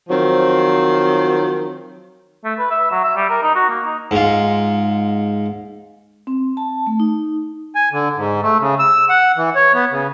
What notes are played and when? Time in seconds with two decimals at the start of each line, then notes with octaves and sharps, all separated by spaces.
0.09 D#3 F3 F#3 C4
2.44 A3
2.59 B4
2.71 E5
2.91 F#3
3.04 E5
3.16 G3
3.30 A#4
3.43 D#4
3.55 F#4
3.70 A#3
3.85 D#4
4.11 G#2 F4
6.27 C4
6.57 A5
6.87 A3
7.00 D#4
7.75 G#5
7.92 D3
8.16 G#2
8.43 A3
8.60 C#3
8.79 E6
9.10 F#5
9.37 E3
9.55 C#5
9.74 B3
9.91 C#3